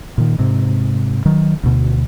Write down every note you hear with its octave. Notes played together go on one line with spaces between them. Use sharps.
A#2 D#3
G#2 C3
D#3 F#3
D2 B2